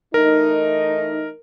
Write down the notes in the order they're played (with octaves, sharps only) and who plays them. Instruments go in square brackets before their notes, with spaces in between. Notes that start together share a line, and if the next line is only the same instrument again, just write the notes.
[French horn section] E3 A3 D#4 [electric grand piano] A#4